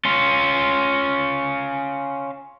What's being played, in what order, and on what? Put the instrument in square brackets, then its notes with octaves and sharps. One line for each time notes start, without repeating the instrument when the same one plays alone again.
[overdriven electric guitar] C#4 F4